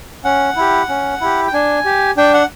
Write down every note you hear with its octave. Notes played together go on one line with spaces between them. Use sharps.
C#4 F#5
E4 G4
C#4
E4 G4
G5
D4 G#5
G4
D4 G5
F#5